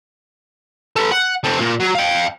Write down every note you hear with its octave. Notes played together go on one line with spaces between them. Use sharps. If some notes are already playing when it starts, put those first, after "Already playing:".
A4 B4
F#5
A3 C4
A#2 A#3
F#3
F5 G5